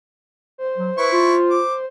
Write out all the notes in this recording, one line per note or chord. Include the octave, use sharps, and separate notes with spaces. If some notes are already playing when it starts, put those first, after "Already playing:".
C5
F#3
E4 B4 C#6
F4
D6